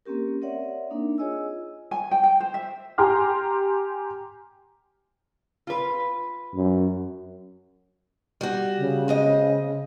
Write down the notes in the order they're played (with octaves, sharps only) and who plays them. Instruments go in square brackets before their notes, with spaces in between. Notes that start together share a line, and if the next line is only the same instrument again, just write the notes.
[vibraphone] A#3 C4 C#4 G4 A#4
C4 A#4 C#5 D5 E5 F#5
A#3 D4 D#4
F4 G#4 C#5 D#5 G#5 E6
[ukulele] G#5
G5
G5
C5
E5
[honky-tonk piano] G4 G#5 A#5 C6 D6 F6
[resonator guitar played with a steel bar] F4 B4
[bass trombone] F#2
[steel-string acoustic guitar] G3 F#4
[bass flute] C#3
[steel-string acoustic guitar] G#3 C4 D#5